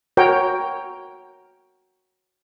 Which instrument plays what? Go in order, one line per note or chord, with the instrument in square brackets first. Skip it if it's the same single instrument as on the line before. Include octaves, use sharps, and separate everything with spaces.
[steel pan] F#4 A#4 C#5 G5